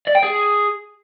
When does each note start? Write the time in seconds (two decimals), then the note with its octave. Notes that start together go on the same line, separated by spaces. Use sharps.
0.08 D5
0.15 G5
0.23 G#4